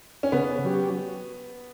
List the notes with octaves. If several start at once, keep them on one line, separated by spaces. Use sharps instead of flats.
C#4
C#3 B3
F#3 C#4 G4